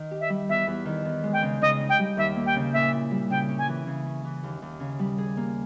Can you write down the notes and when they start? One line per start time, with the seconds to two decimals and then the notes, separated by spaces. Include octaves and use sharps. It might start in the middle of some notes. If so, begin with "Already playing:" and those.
Already playing: D#3
0.11 G4
0.20 E5
0.30 G3
0.49 E2 E5
0.67 E2
0.86 D#3
1.05 E2
1.23 G#3
1.33 G5
1.42 C#3
1.61 C#3 D#5
1.80 D#4
1.89 G5
1.99 G3
2.17 D#2 E5
2.36 A#3
2.46 G5
2.56 C#3
2.73 A#2 E5
2.92 E4
3.11 G3
3.30 C#3 G5
3.49 C#4
3.58 G#5
3.68 E3
3.87 C#3
4.06 C#4
4.24 E3
4.43 D#2
4.62 D#2
4.80 C#3
4.99 G3
5.18 G#4
5.37 A#3